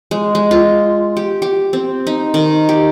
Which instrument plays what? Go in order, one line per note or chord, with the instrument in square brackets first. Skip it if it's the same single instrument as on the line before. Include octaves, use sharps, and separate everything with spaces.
[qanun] G#3
G#3
F4
G4
G4
C4
D#4
D#3
G4